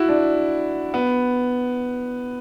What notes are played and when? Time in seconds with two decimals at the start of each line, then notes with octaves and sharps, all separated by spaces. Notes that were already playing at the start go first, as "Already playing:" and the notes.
Already playing: E4 F#4
0.09 D4
0.94 B3